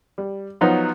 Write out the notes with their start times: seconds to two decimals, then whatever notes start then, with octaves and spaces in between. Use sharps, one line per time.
0.18 G3
0.61 F3 F#3 B3 D#4 F#4